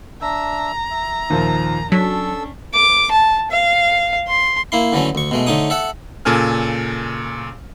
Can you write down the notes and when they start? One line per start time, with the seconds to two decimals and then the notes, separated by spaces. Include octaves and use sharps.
0.22 D4 E5 A#5 E6
0.91 E5
1.30 D#2 A#2 F3
1.92 F#3 C#4 D4 A4 E6 B6
2.74 D6
3.11 A5
3.51 F5
4.28 C6
4.72 A#3 E4 C6
4.92 D3 E3 F#3 A3 C#4
5.15 D2 C#6
5.31 B2 G#3 A3
5.47 D3 A3 D#4 C#5 D#6
5.70 A4 E5 F#5
6.25 A#2 C#3 A4 G#5 F6